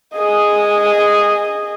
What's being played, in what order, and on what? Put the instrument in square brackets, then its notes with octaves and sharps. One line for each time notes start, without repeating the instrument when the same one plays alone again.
[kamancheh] G#4 D#5